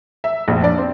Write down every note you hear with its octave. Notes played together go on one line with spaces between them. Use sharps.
E5
A#1 F2
D4 D5
C4